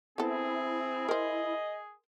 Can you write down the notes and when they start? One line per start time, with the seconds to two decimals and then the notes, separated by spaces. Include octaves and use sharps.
0.18 B3 C4 E4 G#4 A4
1.09 A#4 C5 D#5